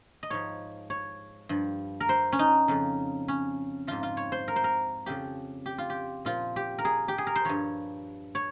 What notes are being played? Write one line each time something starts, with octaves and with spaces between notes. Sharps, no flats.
D#5
G#2 F3 C#5
C#5
G2 F3
A#4
C5
C#4
D#4
F2 C#3 F3
C#4
G#2 F3 F4
F4
C#5
C5
A#4
C5
A#4
F2 C#3 F3 G4
G4
F4
G4
A#2 F3 F4
G4
A#4
G#4
G4
G#4
A#4
C5
G2 F3 C#5
C#5